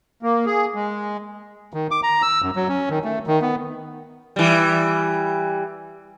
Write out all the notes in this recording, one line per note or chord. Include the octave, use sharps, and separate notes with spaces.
A#3
G#4
G#3
D#3
D6
A#5
E6
F#2
F#3
C#4
D#3
A3
D#3
B3
E3 G3